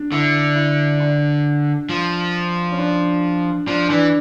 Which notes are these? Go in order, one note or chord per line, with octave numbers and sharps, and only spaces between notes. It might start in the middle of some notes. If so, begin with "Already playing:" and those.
Already playing: D4
D3 E4
E4
D4
F3
C#4
D4
F3 D4
E3 D4